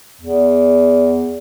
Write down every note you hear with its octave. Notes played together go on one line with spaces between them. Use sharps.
E2